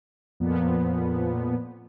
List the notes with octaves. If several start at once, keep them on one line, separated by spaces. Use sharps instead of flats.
F2 A#2 F3 B3